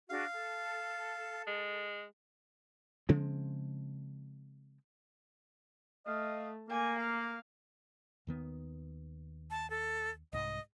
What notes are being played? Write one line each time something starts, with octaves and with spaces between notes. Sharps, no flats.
D4 F#4 G#4 F5
A4
G#3
C#3 F3 G#3 C4
A3 D#5 F5
A#3 G#5
F5
D#2 D#3 B3
A5
A4
C2 G#2 D#5